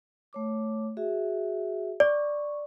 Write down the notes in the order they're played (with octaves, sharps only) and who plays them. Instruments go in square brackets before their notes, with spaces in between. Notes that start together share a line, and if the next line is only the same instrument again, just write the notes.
[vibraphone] A3 C#5 D6
F#4 G#4 E5
[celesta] D5 [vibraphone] C#6